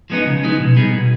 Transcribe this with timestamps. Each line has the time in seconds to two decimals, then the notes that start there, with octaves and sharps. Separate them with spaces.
0.10 F3 G#3 B3 D#4
0.26 C#3
0.43 F3 G#3 B3 D#4
0.60 B2
0.76 G3 B3 D#4 G#4
0.93 B2